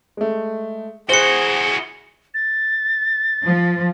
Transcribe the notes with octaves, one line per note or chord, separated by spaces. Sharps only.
G#3 A3
E4 F#4 G#4 C5 F#6 C#7 G7
A6
F3